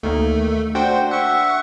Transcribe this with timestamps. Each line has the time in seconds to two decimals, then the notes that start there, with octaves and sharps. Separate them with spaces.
0.03 D2 D#3 A3 A#3
0.75 D4 F#4 C5 G5
1.11 E5 F#5 C#6